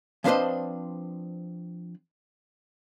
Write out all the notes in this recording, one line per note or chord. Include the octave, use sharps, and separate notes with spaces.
F3 C4 D4 B4 C5 D#5